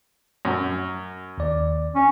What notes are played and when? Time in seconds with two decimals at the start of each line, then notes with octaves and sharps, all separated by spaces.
0.45 F#2
1.38 D#2 D5
1.95 C#4